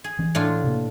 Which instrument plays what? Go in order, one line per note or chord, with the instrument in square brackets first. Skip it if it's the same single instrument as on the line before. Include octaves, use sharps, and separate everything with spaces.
[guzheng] G#4
[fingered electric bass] E3 C#4
[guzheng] A2 D4 F4
[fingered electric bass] C3 A#3